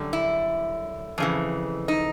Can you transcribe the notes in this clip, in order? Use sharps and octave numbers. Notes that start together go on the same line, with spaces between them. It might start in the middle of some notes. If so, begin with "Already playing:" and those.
Already playing: F#2 D3 G3
E4
F2 C#3 E3
D#4